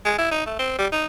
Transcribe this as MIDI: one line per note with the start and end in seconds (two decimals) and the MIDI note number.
0.05 0.18 56
0.18 0.29 64
0.31 0.43 63
0.46 0.55 57
0.59 0.77 60
0.78 0.87 55
0.92 1.06 63